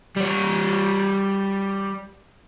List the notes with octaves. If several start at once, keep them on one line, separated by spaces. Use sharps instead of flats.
G3 C#5